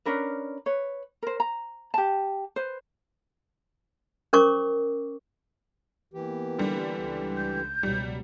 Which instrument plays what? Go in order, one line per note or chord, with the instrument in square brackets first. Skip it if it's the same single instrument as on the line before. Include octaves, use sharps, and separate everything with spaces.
[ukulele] C#4 D4 A#4 B4
B4 C#5
A#4 C5
A#5
G4 A5
B4 C5
[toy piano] C#4 A#4 C5 C#6 D6
[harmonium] E3 G4 [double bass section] A#3 B3
[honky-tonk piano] D3 G3
[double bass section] C#2
[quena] G6
[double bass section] C#2 B2 F#3 [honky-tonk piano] G3